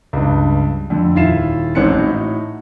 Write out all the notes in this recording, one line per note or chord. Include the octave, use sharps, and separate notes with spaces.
C#2 G2
F2 D3
D#1 D#3 E4 F4 C7 E7
A1 G#2 C4 C#4 F#6 C#7
A2 D#4 F#4